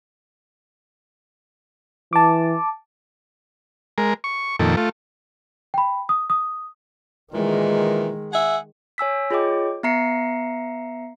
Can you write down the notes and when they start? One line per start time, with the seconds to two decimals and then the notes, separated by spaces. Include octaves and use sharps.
2.13 E3 A5 D6
3.98 G#3 A#4
4.24 C#6
4.59 F2 A#2 D#3 A4
4.77 A3 F4
5.74 G5 B5
6.09 D#6
6.30 D#6
7.33 A#2 D#3 E3 G#3
8.33 G#4 E5 F#5
8.98 C#5 G#5 E6 B6
9.31 F4 G#4 C#5 D#5 G5 D6
9.83 B3 E5 A#5 C7 C#7